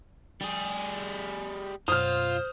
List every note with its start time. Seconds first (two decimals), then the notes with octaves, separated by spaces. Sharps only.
0.41 G3 G#4
1.88 F#2 B2 F4 C5 D#6 F6